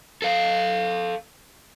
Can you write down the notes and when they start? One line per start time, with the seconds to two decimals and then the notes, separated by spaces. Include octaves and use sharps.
0.22 A4 F5